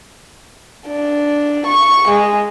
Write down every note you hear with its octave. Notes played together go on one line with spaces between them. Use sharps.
D4
C#6
G#3